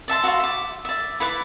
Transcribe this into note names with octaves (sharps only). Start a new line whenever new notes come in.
D5 E5 A5 C6
F#4 E5 F5 C6
E5 D6
D5 E5
E4 B4 D6